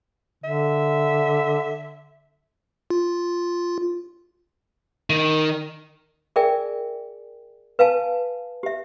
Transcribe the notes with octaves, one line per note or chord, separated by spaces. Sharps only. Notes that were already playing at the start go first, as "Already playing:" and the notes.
D3 E5
F4
D#3
G#4 A#4 D5 E5 G5 G#5
B4 F5 G#5 A5
G4 E5